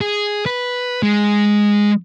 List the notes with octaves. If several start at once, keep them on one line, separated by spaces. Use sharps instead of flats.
G#4
B4
G#3